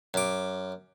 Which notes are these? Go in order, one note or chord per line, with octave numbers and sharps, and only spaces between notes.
F#2 D6